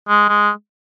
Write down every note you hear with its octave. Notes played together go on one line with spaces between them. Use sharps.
G#3
G#3